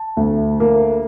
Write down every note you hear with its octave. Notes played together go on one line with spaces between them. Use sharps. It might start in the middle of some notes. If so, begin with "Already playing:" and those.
Already playing: A5
D2
A#3